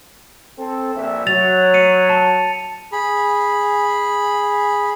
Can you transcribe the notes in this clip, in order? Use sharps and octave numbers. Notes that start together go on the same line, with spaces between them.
C4 A4
A#1 E5
F#3 A6 F7
C#7 D#7
A5
G#4 B5